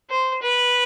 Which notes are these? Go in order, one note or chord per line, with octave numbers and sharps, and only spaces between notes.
C5
B4